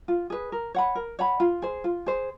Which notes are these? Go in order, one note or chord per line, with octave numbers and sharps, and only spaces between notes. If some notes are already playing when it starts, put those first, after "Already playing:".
F4
G#4 B4
A#4
C#5 F#5 B5
A#4
C#5 F#5 B5
F4
G#4 C5
F4
G#4 C5